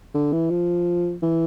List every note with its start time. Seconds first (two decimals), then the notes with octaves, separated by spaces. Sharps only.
0.14 D3
0.32 E3
0.51 F3
1.23 E3